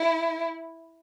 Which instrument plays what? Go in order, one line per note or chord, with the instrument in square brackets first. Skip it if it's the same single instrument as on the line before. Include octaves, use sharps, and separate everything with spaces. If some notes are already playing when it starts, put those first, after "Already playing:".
Already playing: [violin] E4